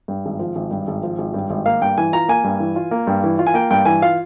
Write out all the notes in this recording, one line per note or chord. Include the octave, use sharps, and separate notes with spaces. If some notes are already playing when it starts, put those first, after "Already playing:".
G2
G#1
F3
G#1
G2
G#1
F3
G#1
G2
G#1
A#3 F5
G2 G5
E3 G#5
F4 A#5
A#3 G#5
G2
E3
F4
A#3
G2
E3
F4
G#5
A#3 G5
G2 G5
E3 G#5
F4 F5